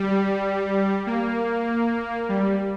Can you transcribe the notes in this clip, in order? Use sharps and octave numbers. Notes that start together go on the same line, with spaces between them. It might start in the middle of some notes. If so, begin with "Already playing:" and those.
Already playing: G3
A#3
G3